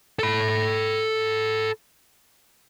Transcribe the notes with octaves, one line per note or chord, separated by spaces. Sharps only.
A4 B5